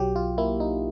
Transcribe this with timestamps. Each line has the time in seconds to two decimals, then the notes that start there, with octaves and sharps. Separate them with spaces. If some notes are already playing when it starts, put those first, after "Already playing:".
Already playing: B1 F#3 G4
0.16 F4
0.38 A#3 E4
0.60 D#4